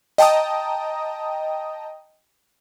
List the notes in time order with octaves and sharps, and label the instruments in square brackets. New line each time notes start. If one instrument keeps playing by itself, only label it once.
[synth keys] D#5 G5 A5 A#5 D#6